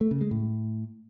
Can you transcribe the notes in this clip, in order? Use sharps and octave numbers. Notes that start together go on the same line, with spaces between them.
A3
C#3
G#3
A2